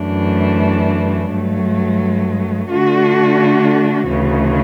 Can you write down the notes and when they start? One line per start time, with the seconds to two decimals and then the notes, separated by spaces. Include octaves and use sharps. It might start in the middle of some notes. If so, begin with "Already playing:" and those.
Already playing: F#2 E3 A3 D4
1.31 G2 F#3 A3
2.70 D3 A3 D4 F#4
4.08 D2 C#3 E3